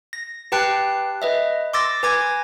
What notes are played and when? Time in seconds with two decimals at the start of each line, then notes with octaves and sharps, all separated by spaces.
0.13 A#6
0.52 G4 B4 G5 A5 F#6 C7
1.22 B4 D#5 E5
1.73 C6 D6 E6 A6 A#6
2.03 B4 G#5 D6 G#6 A#6